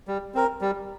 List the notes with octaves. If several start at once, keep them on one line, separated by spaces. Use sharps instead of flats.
G3
C4 A#4
G3